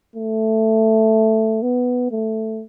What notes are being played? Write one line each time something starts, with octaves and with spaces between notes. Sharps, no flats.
A3
B3
A3